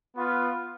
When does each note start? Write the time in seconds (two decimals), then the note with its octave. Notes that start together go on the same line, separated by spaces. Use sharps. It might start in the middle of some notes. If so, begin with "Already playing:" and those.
0.16 B3 F4